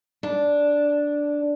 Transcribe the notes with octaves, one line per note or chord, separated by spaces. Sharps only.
D4